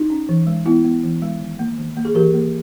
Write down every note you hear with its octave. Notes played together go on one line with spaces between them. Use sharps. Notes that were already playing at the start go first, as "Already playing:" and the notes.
Already playing: D#4
C#4
E3
G#3
B3 E4
B3
E3
G#3
D#3
A#3
D#3
A#3
G#4
E3 G4 A#4
A#3